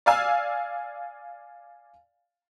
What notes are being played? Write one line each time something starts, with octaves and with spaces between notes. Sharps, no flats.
D5 F5 G#5 E6